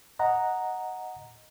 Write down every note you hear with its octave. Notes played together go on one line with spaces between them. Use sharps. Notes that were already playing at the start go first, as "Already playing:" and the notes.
D#5 F#5 A#5